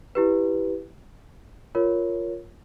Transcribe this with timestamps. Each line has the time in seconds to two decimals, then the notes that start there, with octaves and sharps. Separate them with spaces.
0.15 E4 G4 B4
1.75 F4 A#4 C#5